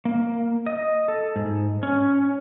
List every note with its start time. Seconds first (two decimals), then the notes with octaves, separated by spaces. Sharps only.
0.05 A#3
0.66 D#5
1.08 A4
1.36 G#2
1.83 C#4